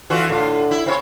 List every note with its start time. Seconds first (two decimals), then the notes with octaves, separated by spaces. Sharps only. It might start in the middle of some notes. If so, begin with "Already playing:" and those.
0.10 D3 E3 F4 F#4
0.29 A2 D3 F4
0.71 E4
0.86 C4 C#4 F4 C#5 E5 B5